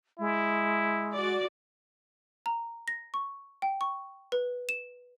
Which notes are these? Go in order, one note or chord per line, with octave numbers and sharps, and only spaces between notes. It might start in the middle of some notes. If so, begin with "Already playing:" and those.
G#3 E4
F#4 D5
A#5
A#6
C#6
G5
C#6
B4
E7